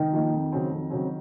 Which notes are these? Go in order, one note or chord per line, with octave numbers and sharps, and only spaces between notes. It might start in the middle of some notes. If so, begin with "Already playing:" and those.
Already playing: D#3
F3 A#3 D#4
F2
C#3 F#3 C4
F2
C#3 F#3 C4